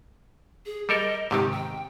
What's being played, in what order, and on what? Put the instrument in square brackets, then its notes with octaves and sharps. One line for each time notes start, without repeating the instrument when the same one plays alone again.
[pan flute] G#4
[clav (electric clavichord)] G3 A4 A#4 [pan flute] D#5
[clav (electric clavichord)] G#2 C3 D#3 [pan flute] G4
[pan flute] G5